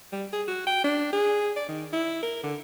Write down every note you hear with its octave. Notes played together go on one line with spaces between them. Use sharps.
G3
G#4
F#4
G5
D4
G#4
D5
D#3
E4
A#4
D3